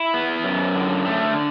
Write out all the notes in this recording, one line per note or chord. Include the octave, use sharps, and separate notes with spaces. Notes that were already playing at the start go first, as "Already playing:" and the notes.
Already playing: E4
B3
F#2
D3
A3